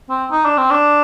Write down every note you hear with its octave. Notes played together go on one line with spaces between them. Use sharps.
C4
D#4
D4
C4
D4